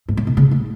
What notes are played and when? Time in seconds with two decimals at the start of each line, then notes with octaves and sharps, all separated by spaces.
0.09 G#2
0.17 A2
0.27 B2
0.37 C#3
0.51 A3